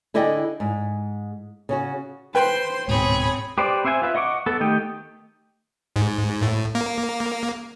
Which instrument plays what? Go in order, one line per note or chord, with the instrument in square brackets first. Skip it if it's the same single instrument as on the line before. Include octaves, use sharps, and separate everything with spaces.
[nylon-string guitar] D3 E4 G#4 D5 D#5 G5
G#2
C#3 C#4 F#4
[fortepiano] B4 G5 [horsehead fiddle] C5 [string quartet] C6
[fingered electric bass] D1 G#2 B2 [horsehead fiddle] C4 C#5 [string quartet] G#4 B5
[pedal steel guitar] G4 B4 C5 D5
C4 C5 E5 F#5 G#5
F4 B4 E5
D#5 F#5 C#6 D6
B3 A4
D#3 A3 G4 D#5 G5
[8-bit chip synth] G#2
A2
A#3